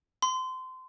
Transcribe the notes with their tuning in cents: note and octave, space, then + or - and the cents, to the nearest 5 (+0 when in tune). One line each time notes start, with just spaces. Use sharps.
C6 -25